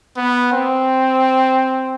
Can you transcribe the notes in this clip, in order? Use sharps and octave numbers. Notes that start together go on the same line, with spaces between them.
B3
C4